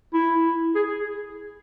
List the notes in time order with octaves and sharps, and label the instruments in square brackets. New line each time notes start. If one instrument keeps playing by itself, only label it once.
[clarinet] E4
G#4